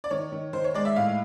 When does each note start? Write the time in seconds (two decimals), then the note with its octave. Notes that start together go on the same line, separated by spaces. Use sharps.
0.04 D5
0.10 D#3 C#5
0.32 D#3
0.53 D#3 C5
0.64 C#5
0.74 G#3 D5
0.85 E5
0.96 A2 F5